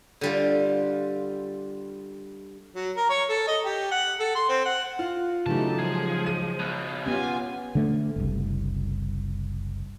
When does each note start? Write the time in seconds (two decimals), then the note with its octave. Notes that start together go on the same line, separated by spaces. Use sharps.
0.21 D3 G3 F4
2.75 F#3
2.96 A#4
3.10 C#5
3.29 A4
3.47 D#5
3.65 G4
3.91 F#5
4.20 A4
4.35 C6
4.49 C4
4.65 F#5
4.99 F4
5.46 C#3 E3 F#3 A3 D#4 G4 A5
5.79 F3 G#3 G#4
6.26 D#7
6.60 B1 B2
7.06 B3 C#4 F4 G4 G#5
7.75 D3 A3
8.16 F#1 C2